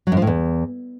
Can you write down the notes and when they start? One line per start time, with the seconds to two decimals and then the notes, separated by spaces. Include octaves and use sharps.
0.07 F#3
0.12 F#2
0.17 F3
0.22 A2
0.27 E2